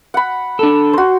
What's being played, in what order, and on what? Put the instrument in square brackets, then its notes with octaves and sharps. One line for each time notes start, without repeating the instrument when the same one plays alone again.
[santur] F#5 B5
[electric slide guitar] D4 A4
[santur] F#4 C5